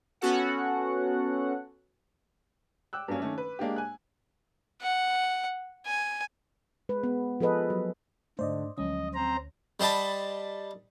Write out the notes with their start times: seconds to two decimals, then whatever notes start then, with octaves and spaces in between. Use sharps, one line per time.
0.21 B3 C#4 F#4 A4 F#5
2.93 G5 D6 E6 F#6
3.08 G2 F#3 A#3 C#4
3.21 D#3 A3 C#4 D4
3.38 B4
3.59 G#3 A#3 D4 G4
3.76 G#5 F#6
4.82 F#5
5.86 G#5
6.89 G#3 B4
7.03 B3
7.40 F3 G#4 A4 B4 D#5
7.70 F#3
8.39 G#2 D3 A3 C5 D5 D#5
8.78 D2 F3 F#3 G#3 C#4 D#5
9.14 C4 C5 A#5
9.80 G3 C5 D#5 A5 B5